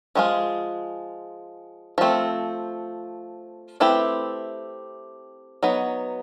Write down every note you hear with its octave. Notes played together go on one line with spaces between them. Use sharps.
F3 G#3 C4 F4 G#4
F3 A3 C4
A3 C4 E4 G4 B4
F#3 B3 D#4